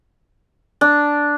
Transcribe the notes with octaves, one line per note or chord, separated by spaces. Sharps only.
D4